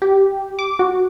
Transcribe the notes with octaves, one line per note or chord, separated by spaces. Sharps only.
G4
D6
F#4